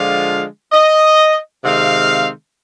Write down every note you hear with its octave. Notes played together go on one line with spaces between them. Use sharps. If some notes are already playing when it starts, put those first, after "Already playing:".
Already playing: D3 F3 G#3 D4 F4 F5
D#5
C3 D#3 G#3 C4 F5